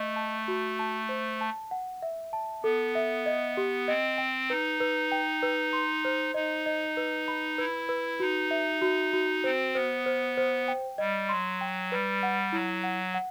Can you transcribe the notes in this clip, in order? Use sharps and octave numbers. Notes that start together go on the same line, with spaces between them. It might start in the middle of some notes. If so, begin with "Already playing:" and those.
Already playing: A3 D#5
A5
F#4
A5
C5
A5
F#5
E5
A5
B3 A4
E5
D#5
G4
C4 D#5
G5
D#4 B4
B4
G5
B4
C6
C5
D#4 D#5
D#5
B4
B5
E4 B4
B4
D#4 F#4
E5
F#4
F#4
C4 C5
B3 C5
C5
C5
G5
G3 D#5
F#3 C6
G5
G3 B4
F#5
F#3 E4
F#5
F#5